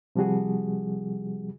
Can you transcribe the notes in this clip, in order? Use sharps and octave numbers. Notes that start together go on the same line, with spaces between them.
C3 F3 G3 F#4 G#4